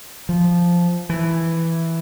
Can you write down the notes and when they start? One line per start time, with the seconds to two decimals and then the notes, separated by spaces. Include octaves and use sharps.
0.29 F3
1.09 E3